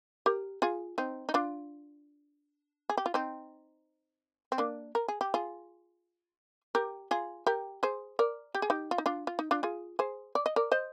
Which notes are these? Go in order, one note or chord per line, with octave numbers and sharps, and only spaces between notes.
G4 A#4
F4 G#4
C4 D#4
D#4
D4 F4
G#4
G4
F4
C4 D#4
C4
A#3 D4
A#4
G#4
G4
F4 G#4
G4 A#4
F4 G#4
G4 A#4
G#4 C5
A#4 D5
G4
G#4
D#4 G4
F4
D#4
D4 F4
F4
D#4
D4 F4
F4 G#4
G#4 C5
D5
D#5
A#4 D5
C5 D#5